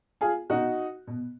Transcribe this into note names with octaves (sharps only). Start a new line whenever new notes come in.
F4 G#4
B2 D#4 F#4
B2